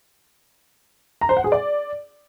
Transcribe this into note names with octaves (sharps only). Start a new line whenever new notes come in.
A#5
C5
F#5
G#4
D5